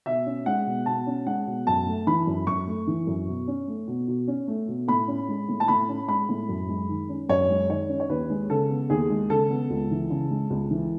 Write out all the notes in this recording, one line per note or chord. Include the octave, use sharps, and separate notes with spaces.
B2 E5
C#4
G#3 F#5
B2
B2 A5
C#4
G#3 F#5
B2
F#2 A5
A3
E3 B5
F#2
F#2 C#6
A3
E3
F#2
B2
C#4
A3
B2
B2
C#4
A3
B2
A2 B5
C#4
G#3
A2
A5
A2 B5
C#4
G#3 B5
A2
F#2
G#3
D#3
C#4
F#2 C#5
G#3
D#3 C#5
C#4
C#5
D#2 B4
G#3
C#3 A4
B3
D#2 G#4
G#3
C#3 A4
B3
C#2
E3
C#3
G#3
C#2
E3